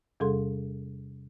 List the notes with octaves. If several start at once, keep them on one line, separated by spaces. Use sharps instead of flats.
E2 C3 G3 G#4 A4 C6